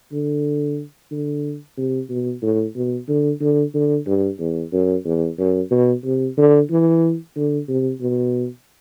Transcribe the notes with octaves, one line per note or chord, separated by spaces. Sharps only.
D3
D3
C3
B2
A2
B2
D3
D3
D3
G2
E2
F#2
E2
F#2
B2
C3
D3
E3
D3
C3
B2